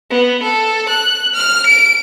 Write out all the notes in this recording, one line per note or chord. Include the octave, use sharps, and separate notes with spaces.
B3
A4
F#6
F6
D7